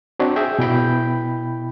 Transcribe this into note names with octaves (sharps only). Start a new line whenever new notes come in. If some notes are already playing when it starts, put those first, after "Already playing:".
C4 D4 F#4
G#4 E5 G5
B2 E4 G5 B5